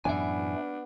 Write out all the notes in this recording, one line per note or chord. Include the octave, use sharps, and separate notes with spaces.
F#2 A2 E3 B3 D4 E5 G#5